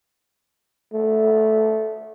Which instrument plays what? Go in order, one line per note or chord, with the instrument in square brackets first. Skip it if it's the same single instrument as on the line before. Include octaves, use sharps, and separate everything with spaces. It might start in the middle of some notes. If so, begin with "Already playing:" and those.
[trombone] A3